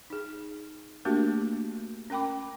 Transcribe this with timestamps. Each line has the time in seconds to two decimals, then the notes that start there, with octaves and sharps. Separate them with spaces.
0.10 D#4 G#4
1.05 A3 A#3 D4 F#4 G4 A#4
2.10 C#4 A#4 G5 B5 D6